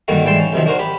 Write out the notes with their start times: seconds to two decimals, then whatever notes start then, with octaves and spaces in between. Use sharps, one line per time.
0.08 G2 D3 D#3 G3 A#3 F#4
0.25 G#2 E3 G3 G5 A5 C6
0.39 C#4
0.53 B1 C3 D#3 F3
0.66 D4 F#4 A#4 C5
0.79 G4 B5